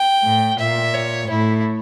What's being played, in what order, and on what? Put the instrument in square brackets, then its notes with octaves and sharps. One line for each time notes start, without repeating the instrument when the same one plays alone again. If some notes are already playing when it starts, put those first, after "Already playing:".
Already playing: [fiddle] G5
[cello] A2
[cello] A#2 [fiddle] E5
[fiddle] C#5
[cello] A2 [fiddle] E4